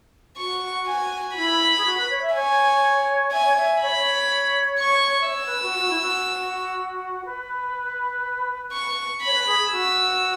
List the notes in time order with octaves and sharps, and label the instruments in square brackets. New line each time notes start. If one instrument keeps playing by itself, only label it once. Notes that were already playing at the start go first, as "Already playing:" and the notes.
[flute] F#4 [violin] C#6
[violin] G#5
[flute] E4 [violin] B5
[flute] G#4
F#4
B4
C#5
E5
[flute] C#5 [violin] G#5
[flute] E5 [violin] G#5
[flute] C#5
E5
[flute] C#5 [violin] B5
[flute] E5
C#5
[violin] C#6
[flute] E5
[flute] C#5 [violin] E6
[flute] B4
F#4
F#4
E4
F#4
B4
[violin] C#6
[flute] C#5 [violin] B5
[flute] B4
G#4
G#4
[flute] F#4 [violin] E6